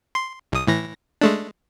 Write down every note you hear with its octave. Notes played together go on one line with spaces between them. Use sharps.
C6
C2 D#6
A2 E3 A#6
G#3 A3 D4